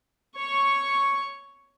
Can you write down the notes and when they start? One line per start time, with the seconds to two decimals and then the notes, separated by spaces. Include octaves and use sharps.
0.35 C#5 C#6